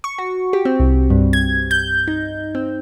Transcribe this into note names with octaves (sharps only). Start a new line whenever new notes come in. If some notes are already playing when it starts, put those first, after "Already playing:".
C#6
F#4
G4
C4
C2
G2
G#6
G6
D#4
C4